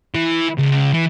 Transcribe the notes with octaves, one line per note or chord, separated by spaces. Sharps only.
E3
C#2
E3